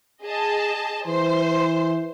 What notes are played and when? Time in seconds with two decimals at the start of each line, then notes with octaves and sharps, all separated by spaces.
0.24 G#4 D#5 A5
1.08 E3 C5 C6